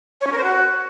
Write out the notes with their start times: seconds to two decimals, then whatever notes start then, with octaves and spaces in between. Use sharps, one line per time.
0.21 C#5
0.27 C#4
0.32 A#4
0.38 C5
0.44 F#4